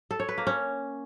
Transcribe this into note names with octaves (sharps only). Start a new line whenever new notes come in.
A4
C#5
B4
A#3
C#4